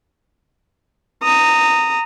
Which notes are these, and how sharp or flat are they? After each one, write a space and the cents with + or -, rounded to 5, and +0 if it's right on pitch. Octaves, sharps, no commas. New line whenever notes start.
A#5 -20 D#6 +0